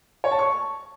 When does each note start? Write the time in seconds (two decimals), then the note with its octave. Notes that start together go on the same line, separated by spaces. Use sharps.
0.24 C#5
0.31 A5
0.39 C#6